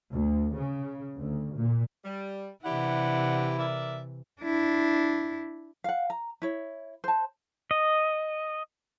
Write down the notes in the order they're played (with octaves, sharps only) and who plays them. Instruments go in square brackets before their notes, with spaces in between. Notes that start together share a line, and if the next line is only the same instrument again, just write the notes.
[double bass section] D2
C#3
D2
A#2
[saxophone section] G3
[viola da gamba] C3 E3 [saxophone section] D4 G4 F#5 [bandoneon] E4
[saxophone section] A#4 D5 E5
[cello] D4 E4
[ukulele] F5 F#5
A#5
E4 C#5
C5 A5
[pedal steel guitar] D#5